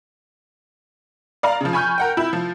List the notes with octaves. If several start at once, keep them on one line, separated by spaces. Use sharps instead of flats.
D5 F5 A#5
C#3 F3
G#5 B5 C#6 F6 G6
A#4 F#5 G5
E4
F3